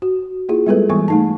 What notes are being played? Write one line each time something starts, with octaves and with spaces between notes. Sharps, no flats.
F#4
A#3 E4 F4 G#4
G3 G#3 B3 G#4 A4 B4
E3 G3 G#3 B3 G#5 C#6
A3 D#4 A5